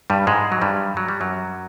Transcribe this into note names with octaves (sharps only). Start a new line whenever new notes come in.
G2 G3
G#2 G#3
F#3
G2 G3
F#3
G3
F#2 F#3